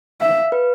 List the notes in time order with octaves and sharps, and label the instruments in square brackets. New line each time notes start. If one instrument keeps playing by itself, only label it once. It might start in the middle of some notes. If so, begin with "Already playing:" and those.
[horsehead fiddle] E5 [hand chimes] F5
[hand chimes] B4